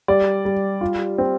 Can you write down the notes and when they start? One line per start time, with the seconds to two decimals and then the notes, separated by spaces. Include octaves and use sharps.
0.08 G3 D5
0.45 G3
0.81 F4
1.18 C4